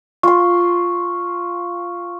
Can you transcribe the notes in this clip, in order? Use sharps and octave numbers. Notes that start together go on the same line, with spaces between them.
F4 C6 C#6